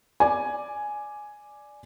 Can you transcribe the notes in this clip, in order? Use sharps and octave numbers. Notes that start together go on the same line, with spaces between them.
D5 G#5